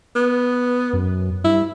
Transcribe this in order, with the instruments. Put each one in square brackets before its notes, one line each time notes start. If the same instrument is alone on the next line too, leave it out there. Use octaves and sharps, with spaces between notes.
[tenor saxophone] B3
[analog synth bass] F#2
[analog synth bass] G2 [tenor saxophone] E4